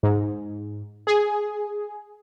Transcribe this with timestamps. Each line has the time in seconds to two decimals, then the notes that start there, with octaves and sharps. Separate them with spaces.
0.03 G#2
1.07 G#4